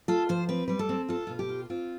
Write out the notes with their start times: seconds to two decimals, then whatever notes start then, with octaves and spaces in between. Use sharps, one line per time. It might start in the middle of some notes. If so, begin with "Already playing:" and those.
0.08 F4 A4
0.29 F3 C5
0.49 C4 B4
0.68 G3 B4
0.79 A4
0.89 C4
1.09 F4 A4
1.27 B2 F4
1.39 G4
1.49 F4
1.70 C4 F4